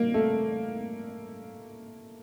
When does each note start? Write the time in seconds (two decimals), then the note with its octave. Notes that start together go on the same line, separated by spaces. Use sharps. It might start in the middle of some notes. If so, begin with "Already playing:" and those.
Already playing: A#3
0.14 A3